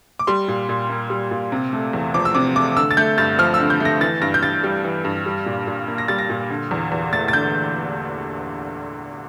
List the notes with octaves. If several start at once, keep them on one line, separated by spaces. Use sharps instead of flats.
D6
G3 C6
A#2
A#2
A#3
G3
A#2
C3
A3
E2
F3 D6
E6
C3 D6
A3 D6
D3 E6
A6
A3 G6
G2 A6
F3 F6
E6
D3
G6
A3 A#6
E3 A6
G2 A#6
G6
G2 A6
G3
E3
G2
G3
A#2
A#2
A#3
A#6
G3 A6
A#6
A#2
D3
E2
E2
A3 A6
A6
D3 G6